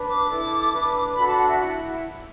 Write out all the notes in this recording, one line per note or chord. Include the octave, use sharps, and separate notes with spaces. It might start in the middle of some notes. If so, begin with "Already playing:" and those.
Already playing: D4 B4
D6
E4 A4
D4 B4
D4 F#4 A4 B5
A5
F#5
E5
E4 F#5